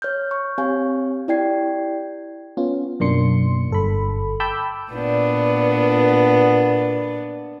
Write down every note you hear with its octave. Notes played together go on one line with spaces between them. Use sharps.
C#5 F6 G6
C#6
C4 G4 C#5 F5 G#5
E4 G4 D5 G5 G#6 C7
B3 C#4 F4
F#2 B2 A#3 D4 C6 C#7
G1 A4 B5
G5 A5 B5 D6 E6 G6
A#2 B3 D4